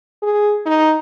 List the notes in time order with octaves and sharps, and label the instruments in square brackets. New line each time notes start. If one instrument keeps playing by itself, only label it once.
[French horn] G#4
D#4